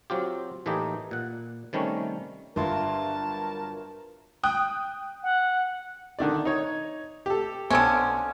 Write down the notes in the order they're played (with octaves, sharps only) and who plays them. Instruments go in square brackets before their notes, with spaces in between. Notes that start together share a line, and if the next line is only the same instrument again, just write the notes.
[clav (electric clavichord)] F#3 C4 F4 G4
A2 E3 A3 A#3 D#4 G4
A#2 F#5
C3 D#3 G3 A3 C#4
[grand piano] G1 C6 [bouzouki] F#3 E4 F4 [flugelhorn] A#4 [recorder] A5
[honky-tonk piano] G5 D#6 F#6
[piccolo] F#5
[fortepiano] D3 D#3 D5
D#4 C#5
G4 A4
[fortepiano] B1 [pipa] D3 C4 C#4